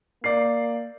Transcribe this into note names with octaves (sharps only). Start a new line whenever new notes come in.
A#3 D5 C7